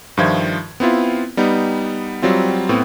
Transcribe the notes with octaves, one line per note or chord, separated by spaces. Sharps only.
G2 D#3 F3 F4 E5 G#6
B3 C4 E4 F4
G3 B3 D#4
F#3 G3 C4 F4
A2 B3 C4